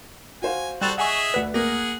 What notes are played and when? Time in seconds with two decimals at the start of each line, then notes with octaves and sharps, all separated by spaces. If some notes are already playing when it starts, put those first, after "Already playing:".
0.42 F#4 C5 F5 G#5
0.81 G3 F#4 A4 C5 F#6 A6 E7 F7
0.98 G#4 D#5 E5 F#5 G#5 C#6
1.34 D2 B4 D5 F#5 B6
1.54 A#3 G#4 F#5 A#6